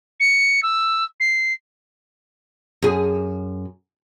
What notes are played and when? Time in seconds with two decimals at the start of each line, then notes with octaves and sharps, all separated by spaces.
0.20 C#7
0.63 E6
1.20 C7
2.82 F#2 G#4